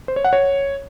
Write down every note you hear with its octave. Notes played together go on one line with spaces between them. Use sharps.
C5
C#5
F#5
C#5